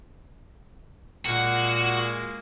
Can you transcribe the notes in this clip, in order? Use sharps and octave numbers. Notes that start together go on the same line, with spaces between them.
A#2 G#3 A#3 F#4